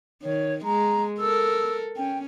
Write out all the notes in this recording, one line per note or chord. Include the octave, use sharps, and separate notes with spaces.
D#3 C#5
G#3 A#5
A4 A#4 E6
C#4 G5